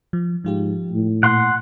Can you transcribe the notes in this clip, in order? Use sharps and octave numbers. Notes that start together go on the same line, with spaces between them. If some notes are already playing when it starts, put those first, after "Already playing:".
F3
G#2 F3 F4 G4
A2
A#2 F#5 C6